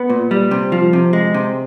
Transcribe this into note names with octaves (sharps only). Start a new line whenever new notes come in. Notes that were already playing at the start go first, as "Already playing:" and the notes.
Already playing: B3
A#2
G3
C3
F3
C3
G#3
C3